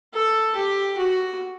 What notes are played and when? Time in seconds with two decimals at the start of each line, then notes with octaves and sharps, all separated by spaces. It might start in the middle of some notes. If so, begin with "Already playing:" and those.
0.14 A4
0.56 G4
0.98 F#4